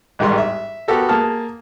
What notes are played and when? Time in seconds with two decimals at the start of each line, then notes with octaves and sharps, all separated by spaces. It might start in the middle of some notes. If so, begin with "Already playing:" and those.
0.19 A1 G#2 D#3 G3 C6
0.38 E5
0.88 B3 F#4 G4 A4 A#4
1.09 A#3 G#4 A5 F6